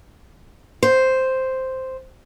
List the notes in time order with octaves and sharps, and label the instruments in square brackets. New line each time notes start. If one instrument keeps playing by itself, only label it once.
[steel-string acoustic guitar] C5